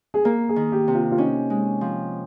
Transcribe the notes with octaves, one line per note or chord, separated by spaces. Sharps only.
G#4
A#3 A#4
G#4
D#3
G4
C3
F4
F4
C#4 D#4
G#3
F3